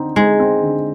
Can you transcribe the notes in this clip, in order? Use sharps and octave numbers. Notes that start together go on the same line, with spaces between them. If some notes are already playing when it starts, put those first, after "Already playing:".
Already playing: D3 C4 D#4
G#3 D#4
C4
D3